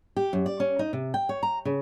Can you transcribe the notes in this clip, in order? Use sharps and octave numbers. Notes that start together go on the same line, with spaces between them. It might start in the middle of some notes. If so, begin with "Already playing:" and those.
G4
F#2
D5
C#4
D#4
C3
G5
C#5
A#5
C#3